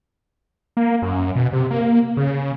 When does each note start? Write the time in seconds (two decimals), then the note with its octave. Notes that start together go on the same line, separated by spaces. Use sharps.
0.77 A#3
1.02 F#2
1.36 B2
1.53 C3
1.71 A#3
2.17 C#3